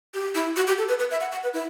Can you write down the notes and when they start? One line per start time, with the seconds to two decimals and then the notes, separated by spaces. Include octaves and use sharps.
0.14 G4
0.35 E4
0.56 F#4
0.67 G4
0.78 A4
0.88 B4
0.99 B4
1.11 E5
1.20 F#5
1.32 F#5
1.43 B4
1.53 E4